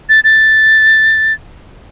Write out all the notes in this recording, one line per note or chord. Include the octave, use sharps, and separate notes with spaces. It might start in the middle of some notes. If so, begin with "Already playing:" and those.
A6
A6